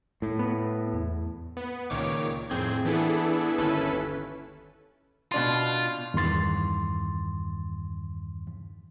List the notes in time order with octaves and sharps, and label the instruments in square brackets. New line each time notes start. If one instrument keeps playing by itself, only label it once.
[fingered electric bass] A2
[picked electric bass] B3
E2
[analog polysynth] B3
C#2 A#2 D#3 C#5 D6
F2 A2 C4 G#4 G6 G#6
E3 B3 D4 E4 G#4 A4
G1 D#2 C#4 E4 A4 B4
[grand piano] B2 D4 C6 [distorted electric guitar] F4
[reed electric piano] E2 G2 D#3 C6 A6